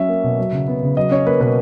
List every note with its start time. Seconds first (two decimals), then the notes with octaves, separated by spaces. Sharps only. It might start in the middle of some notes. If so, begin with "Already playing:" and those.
Already playing: F#3 C#4 E5
0.09 A#3
0.24 B2
0.38 F#3
0.52 C#3
0.68 B3
0.83 C#3
0.97 F#3 D#5
1.11 C#4 C#5
1.27 A#3 B4
1.40 B2 B4